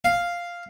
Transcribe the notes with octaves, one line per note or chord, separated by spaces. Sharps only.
F5